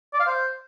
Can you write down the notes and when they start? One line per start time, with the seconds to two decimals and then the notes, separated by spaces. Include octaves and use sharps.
0.13 D5
0.20 F5
0.27 C5